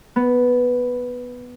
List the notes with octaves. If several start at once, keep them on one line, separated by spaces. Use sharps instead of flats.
B3